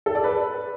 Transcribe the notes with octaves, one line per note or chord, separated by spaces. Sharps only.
A4
D5
B4